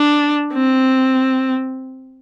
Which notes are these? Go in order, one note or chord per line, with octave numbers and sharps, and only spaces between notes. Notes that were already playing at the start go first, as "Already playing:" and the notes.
Already playing: D4
C4